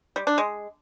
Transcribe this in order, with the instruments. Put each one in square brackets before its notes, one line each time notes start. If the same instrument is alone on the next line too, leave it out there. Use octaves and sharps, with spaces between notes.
[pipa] G3
D4
G#3